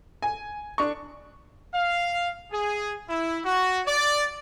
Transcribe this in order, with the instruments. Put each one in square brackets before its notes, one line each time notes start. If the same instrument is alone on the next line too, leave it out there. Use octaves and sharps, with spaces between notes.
[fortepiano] G#5
D4 C#6
[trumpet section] F5
G#4
E4
F#4
D5